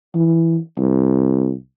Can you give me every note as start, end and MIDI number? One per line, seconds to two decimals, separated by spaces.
0.15 0.58 52
0.77 1.52 36